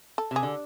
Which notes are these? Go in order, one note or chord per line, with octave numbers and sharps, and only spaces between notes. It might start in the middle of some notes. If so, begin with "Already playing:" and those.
A4
C3
G#4
D3